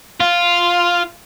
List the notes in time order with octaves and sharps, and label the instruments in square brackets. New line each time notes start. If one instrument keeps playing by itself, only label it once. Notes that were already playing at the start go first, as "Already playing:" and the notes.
[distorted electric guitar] F4